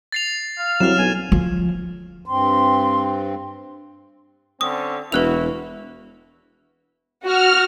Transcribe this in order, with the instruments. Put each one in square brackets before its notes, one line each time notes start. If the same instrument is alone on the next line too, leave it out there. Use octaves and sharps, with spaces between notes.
[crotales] A6 C7 F7
[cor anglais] F5
[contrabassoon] C2 [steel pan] F#3 [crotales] F6 E7
[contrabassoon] B1 [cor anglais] G#5
[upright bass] F3
[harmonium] G2 C4 [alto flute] C6
[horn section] D3 C4 C#4 [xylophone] D#6
[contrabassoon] E1 [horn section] E4 F#4 [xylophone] B4 F#6 F7
[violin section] F#4 [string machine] F6